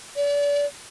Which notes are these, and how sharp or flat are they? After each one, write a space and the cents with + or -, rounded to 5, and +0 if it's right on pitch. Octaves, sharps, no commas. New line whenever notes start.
D5 -35